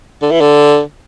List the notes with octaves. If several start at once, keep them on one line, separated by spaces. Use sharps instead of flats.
D3
E3
D3